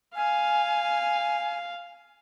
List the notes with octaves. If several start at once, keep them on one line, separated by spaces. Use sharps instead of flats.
F5 G#5